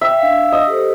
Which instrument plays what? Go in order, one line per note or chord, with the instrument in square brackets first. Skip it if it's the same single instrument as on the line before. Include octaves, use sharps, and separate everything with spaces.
[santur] E5 [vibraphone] G5
[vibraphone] D4 F5
[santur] D#5
[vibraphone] G4 A4 C5